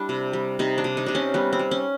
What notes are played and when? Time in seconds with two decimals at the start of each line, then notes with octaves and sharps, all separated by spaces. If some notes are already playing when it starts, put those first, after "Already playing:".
Already playing: G3 D4 E4
0.09 C3
0.33 G3
0.59 C3 D#4
0.78 D4
0.84 C3
0.97 D#4
1.06 C3 D4
1.15 C#4
1.34 G3 B3
1.53 C4
1.59 G3
1.71 C#4